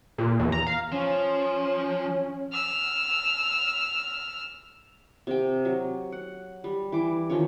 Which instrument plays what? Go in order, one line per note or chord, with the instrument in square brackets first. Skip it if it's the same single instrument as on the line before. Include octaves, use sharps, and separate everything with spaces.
[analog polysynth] A#2
E2
A#5
F5
[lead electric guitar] F3 [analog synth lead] C#4
[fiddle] E6 F6
[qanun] C3 D#5 G5
F#3
F#5
G3
E3 D6
D#3 F3 C#4 C#5